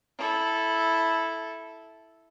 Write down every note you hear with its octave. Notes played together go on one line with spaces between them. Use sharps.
E4 A4